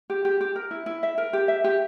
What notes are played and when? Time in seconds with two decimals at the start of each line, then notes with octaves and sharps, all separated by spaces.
0.10 G4
0.25 G4
0.41 G4
0.56 A#4
0.71 E4
0.86 E4
1.03 E5
1.18 A#4
1.33 G4
1.48 E5
1.64 G4